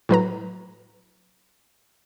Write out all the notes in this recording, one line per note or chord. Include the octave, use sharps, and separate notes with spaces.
A2 F#3 B4 A#5